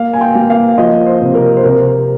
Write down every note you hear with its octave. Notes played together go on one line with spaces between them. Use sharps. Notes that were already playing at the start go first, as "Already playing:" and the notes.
Already playing: A#3 F5
G#5
G5
A#3
F5
F3 D#5
C5
C3
A#4
C5
C3 A#4